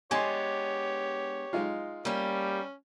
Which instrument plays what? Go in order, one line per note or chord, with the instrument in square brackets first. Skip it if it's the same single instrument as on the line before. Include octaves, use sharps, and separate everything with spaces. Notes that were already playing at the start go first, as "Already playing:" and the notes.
[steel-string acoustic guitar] G#3 B3 D4 [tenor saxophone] G4 [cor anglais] C#5 [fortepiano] G#5 C6
[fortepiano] G#3 D#4 F4
[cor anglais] G3 [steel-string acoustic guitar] A#3 G4 [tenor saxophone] C#4